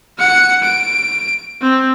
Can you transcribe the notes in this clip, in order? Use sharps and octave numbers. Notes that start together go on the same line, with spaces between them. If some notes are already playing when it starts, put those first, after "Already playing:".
F#5 C#7
D7
C4